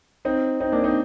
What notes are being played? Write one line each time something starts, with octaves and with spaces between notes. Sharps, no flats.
C4 D#4
C4 D#4
A#3 D4
C4 D#4